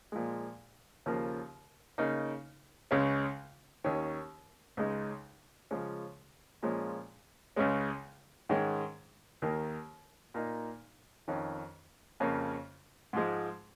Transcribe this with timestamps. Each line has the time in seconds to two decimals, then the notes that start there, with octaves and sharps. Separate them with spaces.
0.12 A#2 F3 G#3
1.06 D#2 C#3 F3 A#3
1.98 C#3 A#3 D#4
2.91 C#2 C#3 G#3 C#4
3.84 D#2 D#3 C#4
4.77 C#2 C#3 G#3 D#4
5.71 C#3 F3 G#3 C#4
6.62 A#2 F3 G#3 C#4
7.56 C#2 C#3 G#3 C#4
8.49 G#2 D#3 G#3 C#4
9.42 D#2 D#3 A#3
10.34 A#2 A#3 D#4
11.28 F2 D#3 C#4
12.20 F2 C#3 A#3 C#4
13.13 G#2 F3 G#3